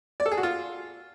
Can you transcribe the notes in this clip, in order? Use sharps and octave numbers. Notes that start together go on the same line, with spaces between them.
D5
A4
G#4
F#4
F4